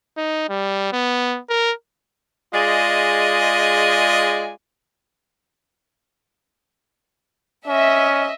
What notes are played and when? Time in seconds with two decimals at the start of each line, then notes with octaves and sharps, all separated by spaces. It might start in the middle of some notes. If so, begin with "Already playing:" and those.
0.17 D#4
0.49 G3
0.92 B3
1.49 A#4
2.54 G#3 F4 G#4 D5 D#5
7.68 C#4 D#5 E5